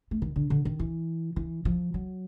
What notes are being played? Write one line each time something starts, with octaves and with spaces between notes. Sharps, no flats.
A3
D#3
D3
D3
D#3
E3
E3
F3
F#3